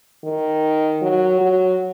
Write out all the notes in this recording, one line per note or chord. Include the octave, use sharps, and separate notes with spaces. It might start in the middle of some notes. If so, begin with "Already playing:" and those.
D#3
F#3
F#3